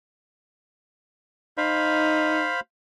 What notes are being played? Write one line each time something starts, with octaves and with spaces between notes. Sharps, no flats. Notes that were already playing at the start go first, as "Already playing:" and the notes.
D#4 C5 F5 B5